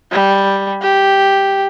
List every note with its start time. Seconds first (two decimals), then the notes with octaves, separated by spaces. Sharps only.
0.12 G3
0.82 G4